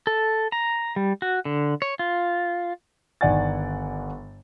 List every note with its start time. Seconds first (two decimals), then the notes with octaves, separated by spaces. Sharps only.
0.07 A4
0.52 A#5
0.96 G3
1.22 F#4
1.45 D3
1.82 C#5
1.99 F4
3.21 G1 D#3 D5 F#5 G#5 A6